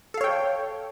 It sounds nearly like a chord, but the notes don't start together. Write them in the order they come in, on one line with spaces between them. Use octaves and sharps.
A4 F5 C#5 G5